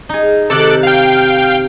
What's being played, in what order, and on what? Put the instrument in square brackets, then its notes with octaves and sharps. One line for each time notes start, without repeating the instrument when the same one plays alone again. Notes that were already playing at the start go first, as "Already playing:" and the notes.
[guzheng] D#4 G#4
[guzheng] C3 D#3 [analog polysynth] A4 D6 F#6
[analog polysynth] F5 G5